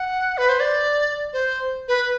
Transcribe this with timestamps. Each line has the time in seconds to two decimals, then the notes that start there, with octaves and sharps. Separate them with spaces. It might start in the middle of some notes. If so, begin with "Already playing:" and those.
Already playing: F#5
0.38 B4
0.49 C5
0.60 D5
1.33 C5
1.88 B4